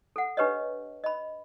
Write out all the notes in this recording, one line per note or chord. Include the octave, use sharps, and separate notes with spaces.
A4 F#5
D4 G4 B4 C#5 D#5
D#5 B5